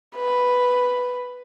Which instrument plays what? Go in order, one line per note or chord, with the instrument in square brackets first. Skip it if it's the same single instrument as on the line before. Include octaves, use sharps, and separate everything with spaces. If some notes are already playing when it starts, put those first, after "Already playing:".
[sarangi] B4